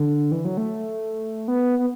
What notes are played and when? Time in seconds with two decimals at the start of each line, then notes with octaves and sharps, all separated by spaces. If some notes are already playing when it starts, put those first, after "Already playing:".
Already playing: D3
0.32 E3
0.45 F#3
0.57 A3
1.48 B3
1.79 B3